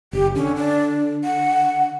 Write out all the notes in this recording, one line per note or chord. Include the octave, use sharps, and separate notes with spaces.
F#1 G4
D3 C#4
D4
F#5